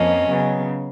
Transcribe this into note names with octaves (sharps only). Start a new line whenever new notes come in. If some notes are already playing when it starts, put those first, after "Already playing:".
Already playing: F2 F3 A#3 C#4 D#5
C#3 F#3 B3